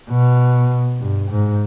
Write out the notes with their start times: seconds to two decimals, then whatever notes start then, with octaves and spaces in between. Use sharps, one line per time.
0.09 B2
0.99 G2
1.30 G#2